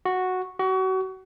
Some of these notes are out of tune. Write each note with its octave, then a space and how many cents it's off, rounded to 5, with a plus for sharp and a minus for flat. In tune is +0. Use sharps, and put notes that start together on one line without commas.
F#4 -5
F#4 +30